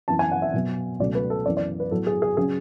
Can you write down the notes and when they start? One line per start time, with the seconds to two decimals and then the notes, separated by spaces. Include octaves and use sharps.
0.08 F#2 E3 B3 A5
0.19 G#5
0.31 F#5
0.42 E5
0.54 B2 F#3 B3
1.00 C#2 B2 F#3 A3 D5
1.15 B4
1.30 A4
1.46 F#2 E3 B3 D5
1.57 D5
1.80 B4
1.91 A2 F#3 B3 A4
2.07 G#4
2.22 G#4
2.37 C#3 F#3 C#4 G#4